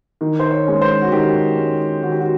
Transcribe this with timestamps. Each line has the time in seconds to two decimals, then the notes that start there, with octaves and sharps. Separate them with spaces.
0.21 D#3
0.40 C5
0.51 C#5
0.66 G#3 C#4
0.81 C5
1.02 F#4
1.12 D#3 G4
1.57 G#3 C#4
2.03 D#3 F#4
2.12 G4
2.20 F#4